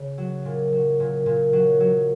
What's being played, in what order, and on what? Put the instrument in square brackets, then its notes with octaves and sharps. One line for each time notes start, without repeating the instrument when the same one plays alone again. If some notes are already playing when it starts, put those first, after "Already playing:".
Already playing: [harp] C#3
F#3
A#2
F#3
A#2
A#2
F#3
F#3